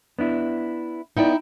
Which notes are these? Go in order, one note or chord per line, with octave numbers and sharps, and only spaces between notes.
B3 D4 E4
B3 D#4 E4 D5 G5